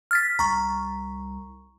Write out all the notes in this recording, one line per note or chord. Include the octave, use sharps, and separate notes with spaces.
F6 A6 B6
C2 A#5 C#6